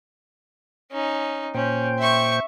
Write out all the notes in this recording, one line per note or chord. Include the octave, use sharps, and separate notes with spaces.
C#4 D#4
A#2 C#4 C5 G5
E5 C#6